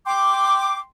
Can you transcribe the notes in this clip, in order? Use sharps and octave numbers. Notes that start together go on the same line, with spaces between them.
G5 C6 D6